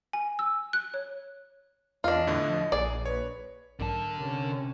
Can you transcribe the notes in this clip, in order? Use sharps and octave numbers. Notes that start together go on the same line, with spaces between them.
G#5
E6
F#6
C#5
E2 D4 F4 D#5
A2 D3
F3
A#1 G#4 D5
B4 C#5
B1 G#2 D3 F#3 A#4 A5
C3 C#4